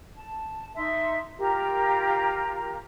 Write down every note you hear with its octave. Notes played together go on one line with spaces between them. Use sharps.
A5
D#4 E5 C6
F4 G4 A#4 A#5